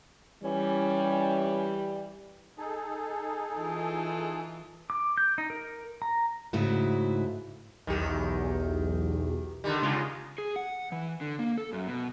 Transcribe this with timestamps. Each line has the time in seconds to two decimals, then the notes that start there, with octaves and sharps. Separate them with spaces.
0.44 E3 G3 C#4
2.58 D#4 G#4 A4
3.55 E3 F4
4.90 D6
5.17 G6
5.38 D#4
5.50 A#4
6.02 A#5
6.53 G#2 C#3 A3 D#4 E4 F#4
7.87 B1 E2 D#3 G4
9.64 D3 D#3 G3
9.83 C#3 G#3 F4
10.38 G#4
10.56 F#5
10.92 E3
11.21 D3
11.39 A#3
11.58 A4
11.73 F#2
11.88 B2